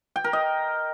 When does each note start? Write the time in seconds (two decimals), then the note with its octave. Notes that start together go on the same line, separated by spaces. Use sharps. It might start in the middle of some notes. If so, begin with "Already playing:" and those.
0.16 G5
0.24 A#4
0.33 D#5